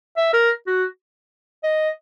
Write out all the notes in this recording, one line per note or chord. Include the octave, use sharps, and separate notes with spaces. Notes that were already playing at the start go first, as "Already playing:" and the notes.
E5
A#4
F#4
D#5